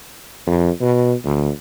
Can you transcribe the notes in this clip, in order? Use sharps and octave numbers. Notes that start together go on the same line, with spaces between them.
F2
B2
D2